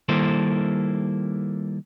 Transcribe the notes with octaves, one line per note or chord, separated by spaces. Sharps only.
D#3 G3 A#3 E4 A4 C5